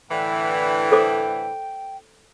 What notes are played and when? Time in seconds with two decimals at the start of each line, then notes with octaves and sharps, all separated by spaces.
0.11 A2 D3 E3 G5
0.92 A4 C5 D6